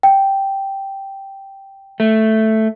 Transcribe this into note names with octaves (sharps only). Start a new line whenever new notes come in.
G5
A3